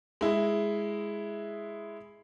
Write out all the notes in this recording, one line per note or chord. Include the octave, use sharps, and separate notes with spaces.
G#3 E4